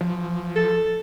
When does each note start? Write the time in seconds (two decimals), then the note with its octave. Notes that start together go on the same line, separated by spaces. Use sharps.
0.01 F3
0.56 A4